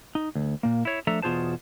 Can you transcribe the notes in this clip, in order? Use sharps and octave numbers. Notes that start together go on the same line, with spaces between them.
D#4
D2
A#2 A#3
E4 C#5
F3 A3 D4 A4 E5 A#5
E2 B2 F4 G#4 C5 A5